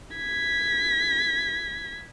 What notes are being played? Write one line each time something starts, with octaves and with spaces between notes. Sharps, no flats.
G#6 B6